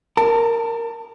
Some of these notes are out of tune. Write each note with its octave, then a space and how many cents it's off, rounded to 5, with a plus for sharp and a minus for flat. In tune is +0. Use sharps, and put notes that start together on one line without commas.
A#4 -5 A5 +25